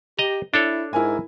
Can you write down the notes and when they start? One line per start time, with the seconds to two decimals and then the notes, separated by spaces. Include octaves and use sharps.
0.19 G4 D#5 A#5
0.54 D4 E4 A4 C#5
0.93 G#2 E4 A#4 G#5